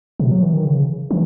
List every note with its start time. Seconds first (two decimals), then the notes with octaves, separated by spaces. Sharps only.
0.20 B2
0.31 F#3
0.42 E3
0.53 D#3
0.65 C#3
1.11 E3